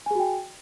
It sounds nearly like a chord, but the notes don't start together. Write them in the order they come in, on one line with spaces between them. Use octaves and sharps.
G#5 G#4 F#4 G5